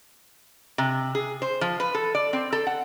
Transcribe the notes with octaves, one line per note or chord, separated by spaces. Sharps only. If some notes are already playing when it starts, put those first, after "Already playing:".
C3
G#4
C5
F3
B4
A4
D5
C4
A4
F#5